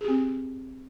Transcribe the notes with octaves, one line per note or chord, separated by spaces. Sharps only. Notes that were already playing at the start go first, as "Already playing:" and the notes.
C4 G4 G#4